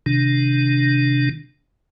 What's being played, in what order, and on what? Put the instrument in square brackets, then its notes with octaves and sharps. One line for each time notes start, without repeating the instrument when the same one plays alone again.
[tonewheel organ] C3 D#3 D4